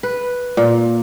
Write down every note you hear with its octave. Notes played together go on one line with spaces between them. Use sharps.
B4
A#2